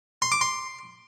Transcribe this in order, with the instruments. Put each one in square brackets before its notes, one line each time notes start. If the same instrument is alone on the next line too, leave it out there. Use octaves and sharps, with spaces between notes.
[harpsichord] C6
D6
C6